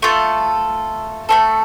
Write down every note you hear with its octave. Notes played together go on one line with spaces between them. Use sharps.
A3 F4 A4
A3 C4 A4